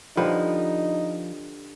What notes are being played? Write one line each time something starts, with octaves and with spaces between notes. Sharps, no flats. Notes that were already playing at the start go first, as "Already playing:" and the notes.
D3 F3 G3 D#4 B4